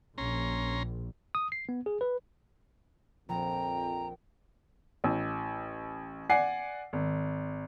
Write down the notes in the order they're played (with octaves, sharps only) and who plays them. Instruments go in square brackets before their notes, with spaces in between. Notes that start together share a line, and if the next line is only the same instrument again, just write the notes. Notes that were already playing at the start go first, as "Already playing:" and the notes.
[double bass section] A#1 [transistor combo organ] C#4 A#5 C6
[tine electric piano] D#6
C7
B3
G#4
B4
[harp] A#1 [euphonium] F2 [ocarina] G5 [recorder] A#5
[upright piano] A1
D5 F#5 G#5 C7
G#1